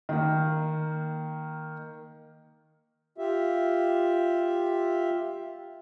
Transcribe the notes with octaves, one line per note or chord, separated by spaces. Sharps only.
D#3 A#3
F4 G4 E5